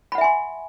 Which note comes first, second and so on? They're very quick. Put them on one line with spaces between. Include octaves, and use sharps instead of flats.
B5 F#5 E5 G#5 C6